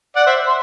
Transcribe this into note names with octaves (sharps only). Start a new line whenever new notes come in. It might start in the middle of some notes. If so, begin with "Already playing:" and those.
D5 F#5
C5 E5
C6